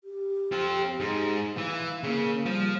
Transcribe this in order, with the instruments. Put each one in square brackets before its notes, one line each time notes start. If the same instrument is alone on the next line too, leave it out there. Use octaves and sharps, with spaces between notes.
[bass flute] G4
[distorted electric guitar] C4 F4
G#2
[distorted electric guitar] E3 [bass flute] F5
[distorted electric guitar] C#3 [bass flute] A#3
[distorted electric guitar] F3 [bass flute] G3